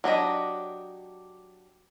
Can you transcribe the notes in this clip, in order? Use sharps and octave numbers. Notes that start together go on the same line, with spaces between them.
F#3 D4 G4 D#5